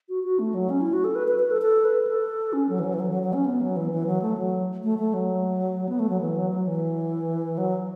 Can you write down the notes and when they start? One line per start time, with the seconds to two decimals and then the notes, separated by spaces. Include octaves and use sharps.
0.09 F#4
0.24 F#4
0.39 A3
0.54 F#3
0.70 C#4
0.81 E4
0.93 F#4
1.04 A4
1.15 B4
1.28 B4
1.39 B4
1.51 A4
1.62 A4
1.85 B4
2.07 A4
2.53 C#4
2.69 F#3
2.79 E3
2.84 F#3
2.94 E3
3.00 F#3
3.11 F#3
3.23 F#3
3.33 C#4
3.46 B3
3.61 F#3
3.77 E3
3.92 E3
4.06 F#3
4.22 A3
4.37 F#3
4.83 A3
4.99 A3
5.14 F#3
5.89 B3
5.99 A3
6.09 F#3
6.21 E3
6.36 F#3
6.51 F#3
6.67 E3
7.58 F#3